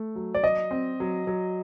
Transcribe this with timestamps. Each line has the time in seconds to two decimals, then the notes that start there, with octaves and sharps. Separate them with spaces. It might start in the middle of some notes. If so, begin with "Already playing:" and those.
Already playing: A3
0.15 F#3
0.34 D5
0.43 F#3 D#5
0.71 C4
1.00 F#3
1.27 F#3